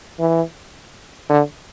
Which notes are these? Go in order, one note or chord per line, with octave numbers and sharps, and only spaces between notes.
E3
D3